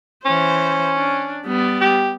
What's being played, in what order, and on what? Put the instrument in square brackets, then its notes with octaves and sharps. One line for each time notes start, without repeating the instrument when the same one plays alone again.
[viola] E3 C5 [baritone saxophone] C#4
[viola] D4
G3 B3
[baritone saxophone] G4